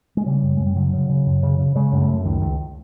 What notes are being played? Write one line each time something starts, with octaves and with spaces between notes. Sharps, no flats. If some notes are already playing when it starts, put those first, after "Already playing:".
G#3
C#3 G3
F#2
F#2 G#3
G3
C#3 F#3
C#3
C#3
F#2
C#3
C#3
C#3 G#3
F#2 G#3
A3
F#2
C#2 D#3
C#2